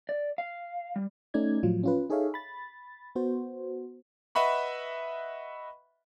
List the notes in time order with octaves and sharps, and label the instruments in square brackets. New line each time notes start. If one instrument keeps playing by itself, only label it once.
[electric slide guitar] D5
F5
G3
[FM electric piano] A3 C#4 D#4 D5 G#6
A2 F3 F#3 F4
C#4 F4 B4
D#4 G#4 A4 C#5 E5 F5
B5 A6
B3 F#4 C5
[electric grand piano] B4 D#5 E5 F#5 B5 C#6